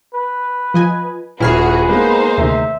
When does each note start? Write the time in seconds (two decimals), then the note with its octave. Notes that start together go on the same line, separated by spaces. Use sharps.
0.14 B4
0.74 F3 D#5 G#5
1.40 D#1 E4 F#4 G#4 B4 F6 C7
1.89 G#3 A#3 B3 D#4 C5
2.38 D2 C3 D#3 E5